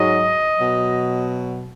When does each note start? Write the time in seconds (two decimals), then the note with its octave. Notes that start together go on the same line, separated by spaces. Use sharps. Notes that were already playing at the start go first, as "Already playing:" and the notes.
Already playing: G#2 F#3 D#5
0.57 B2 F#3